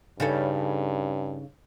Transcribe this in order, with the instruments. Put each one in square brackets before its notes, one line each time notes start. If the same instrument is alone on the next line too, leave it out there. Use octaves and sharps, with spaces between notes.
[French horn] G2 [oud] C#3 D#4 A4